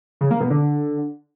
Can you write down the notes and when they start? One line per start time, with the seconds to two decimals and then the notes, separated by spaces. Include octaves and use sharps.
0.21 C#3
0.31 A#3
0.40 B2
0.50 D3